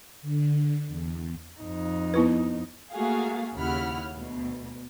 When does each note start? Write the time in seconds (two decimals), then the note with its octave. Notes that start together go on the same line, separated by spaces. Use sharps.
0.22 D3
0.88 E2
1.59 F2 D#4
2.14 B3 E4 B4
2.91 A3 A#3 F#4 G#4 F5
3.54 D#2 C#3 E4 F#5 B5 F6
4.13 D2 B2